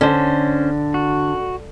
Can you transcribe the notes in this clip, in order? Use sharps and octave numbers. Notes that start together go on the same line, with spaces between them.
D3 C#4 C5
F#4